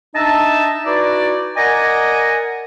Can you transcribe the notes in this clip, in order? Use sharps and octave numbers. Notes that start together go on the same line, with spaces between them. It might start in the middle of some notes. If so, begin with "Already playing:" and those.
D4 D#4 D#5 E5 A5
D#4 E4 F#4 B4 D5
A#4 D5 D#5 F#5 G#5 A#5